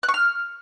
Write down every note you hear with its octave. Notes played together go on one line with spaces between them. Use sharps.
F#6
C#6
F6